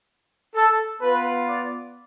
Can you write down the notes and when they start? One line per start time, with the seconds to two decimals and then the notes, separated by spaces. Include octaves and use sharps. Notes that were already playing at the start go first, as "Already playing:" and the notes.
0.54 A4
1.01 B3 F4 B4
1.48 D5